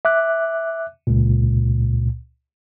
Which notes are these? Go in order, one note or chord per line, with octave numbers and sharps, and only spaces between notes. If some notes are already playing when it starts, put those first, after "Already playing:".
E5 D6 F#6
C#2 A#2